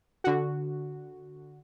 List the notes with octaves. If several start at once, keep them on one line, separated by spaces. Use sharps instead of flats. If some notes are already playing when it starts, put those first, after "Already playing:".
D3 F#4